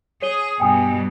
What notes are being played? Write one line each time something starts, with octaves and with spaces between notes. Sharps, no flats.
G#4 C#5 D#7 G7
G2 B2 G5 G#5 D#6